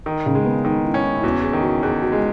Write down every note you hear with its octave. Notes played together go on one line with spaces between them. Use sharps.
D#3
C#3
G#3
B3
D#3 D#4
E4
C#4
E4
E4
E2 F#4
G#4
D#3
F#4
E2 G#4
F#4
G#3